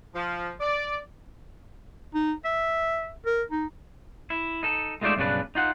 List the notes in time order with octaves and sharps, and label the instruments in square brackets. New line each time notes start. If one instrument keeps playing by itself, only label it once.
[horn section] F3
D5
[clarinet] D#4
E5
A#4
D#4
[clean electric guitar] E4
D#4 A4
G#3 A3 D#4 F4 D5 E5
B1 G2 C#3 D4 B4
D#4 F4 F#5